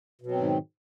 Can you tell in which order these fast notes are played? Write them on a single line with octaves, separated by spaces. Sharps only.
B2 F#3 C4 G#2 D#3